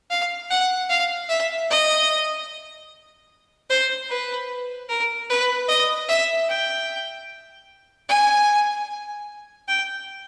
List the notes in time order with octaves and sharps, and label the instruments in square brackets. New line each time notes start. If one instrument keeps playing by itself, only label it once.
[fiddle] F5
F#5
F5
E5
D#5
C5
B4
A#4
B4
D#5
E5
G5
G#5
G5